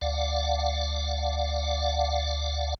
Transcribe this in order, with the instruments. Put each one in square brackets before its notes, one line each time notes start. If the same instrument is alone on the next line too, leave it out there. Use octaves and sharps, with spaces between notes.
[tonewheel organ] D2 D5 F5 F#5